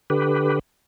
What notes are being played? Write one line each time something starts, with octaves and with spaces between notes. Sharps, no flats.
D3 G4 B4